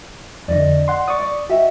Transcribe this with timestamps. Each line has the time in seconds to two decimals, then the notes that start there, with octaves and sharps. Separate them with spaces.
0.48 F2 D3 D5 D#5
0.88 F#5 C6
1.08 D5 C#6 D#6
1.19 D5
1.50 F#4 D#5 E5 G5